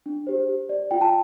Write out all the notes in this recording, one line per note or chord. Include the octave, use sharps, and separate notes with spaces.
D4
G4 C5
G4
D5
F4 G5
A5